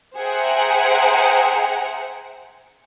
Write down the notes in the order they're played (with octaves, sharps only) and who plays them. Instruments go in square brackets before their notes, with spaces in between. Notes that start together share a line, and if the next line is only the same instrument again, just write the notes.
[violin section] G#4 C5 E5 F#5 G5 A#5